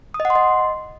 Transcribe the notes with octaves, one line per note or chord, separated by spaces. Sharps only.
D#6
D#5
F#5
C6
D#5